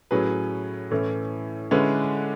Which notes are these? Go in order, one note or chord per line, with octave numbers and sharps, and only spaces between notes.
A2 F#3 C#4 G#4 B4
A2 E3 A3 C#4 E4
D3 G#3 C#4 E4 B4